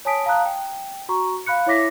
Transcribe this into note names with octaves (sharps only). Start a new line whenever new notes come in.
C#5 G#5 A5 D#6 B6 D7
F5 A5 A#5 D#6 F#6
G5
F#4 A#5 C#6
F5 B5 F#6 C#7
E4 C#5 E5 D6 A#6 B6